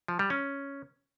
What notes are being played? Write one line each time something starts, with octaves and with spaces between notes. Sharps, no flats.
F3
G3
C#4